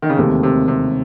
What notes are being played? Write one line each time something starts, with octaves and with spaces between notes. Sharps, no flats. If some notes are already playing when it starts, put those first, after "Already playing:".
D#3
C#3
E1 D#2 C3 D#3 A3
C3
C3